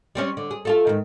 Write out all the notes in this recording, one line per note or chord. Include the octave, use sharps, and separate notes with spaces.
G3 C4 C#4
D3
G#4
A3 F4 A4
G#2 D#3